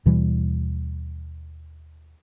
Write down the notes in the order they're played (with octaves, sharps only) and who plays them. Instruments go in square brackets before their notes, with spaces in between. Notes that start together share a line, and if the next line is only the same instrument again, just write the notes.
[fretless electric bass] D#2 B2 E3 G3